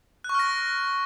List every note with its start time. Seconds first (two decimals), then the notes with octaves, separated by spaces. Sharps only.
0.24 F#6
0.29 C#6
0.34 F6
0.39 A#6